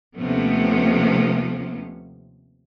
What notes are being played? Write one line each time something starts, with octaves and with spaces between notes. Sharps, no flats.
D#2 C3 F3 A3 B3 C#4